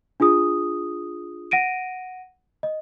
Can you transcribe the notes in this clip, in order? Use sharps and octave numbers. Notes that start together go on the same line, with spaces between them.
D4 F4 G#4 D#6
F#5 A#6 D7 D#7
D#5